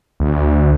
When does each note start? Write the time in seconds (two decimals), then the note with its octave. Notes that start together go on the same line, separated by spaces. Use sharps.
0.20 D2